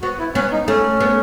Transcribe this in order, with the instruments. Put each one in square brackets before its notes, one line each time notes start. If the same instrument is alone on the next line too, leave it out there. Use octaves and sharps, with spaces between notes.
[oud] B3 [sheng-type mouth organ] F#4
[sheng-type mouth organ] E4
[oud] B3 [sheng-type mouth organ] C#4
[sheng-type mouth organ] D#4
[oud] A3 [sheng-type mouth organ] C#4
[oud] B3